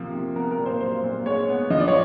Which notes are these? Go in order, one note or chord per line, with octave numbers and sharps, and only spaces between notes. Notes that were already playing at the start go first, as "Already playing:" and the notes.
Already playing: C3 F3 A#3
C3
B3 A#4
A#4
A#2
C5
F#3 C5
A#2
G#3 C#5
B3
F3 D#5
D5
C#5